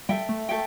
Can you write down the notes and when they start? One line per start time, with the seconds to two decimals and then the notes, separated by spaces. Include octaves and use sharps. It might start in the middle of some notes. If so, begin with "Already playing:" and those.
0.09 G3 A4 E5 G5
0.29 A3
0.49 A4 E5 G5